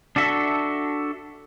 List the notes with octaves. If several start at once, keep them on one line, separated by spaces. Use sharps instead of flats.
D4 F#4 A4 E5